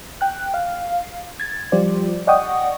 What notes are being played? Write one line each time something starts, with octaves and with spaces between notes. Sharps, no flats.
G5 F#6
F5
G#6 A6
F3 G3 F4 G4 C5 D5
D5 D#5 F#5 G5 C#6 D#6